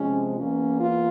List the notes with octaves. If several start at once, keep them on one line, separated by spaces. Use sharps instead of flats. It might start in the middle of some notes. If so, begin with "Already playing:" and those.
Already playing: C3 F3 G#3 C#4
E2 E3 A#3 C#4
F4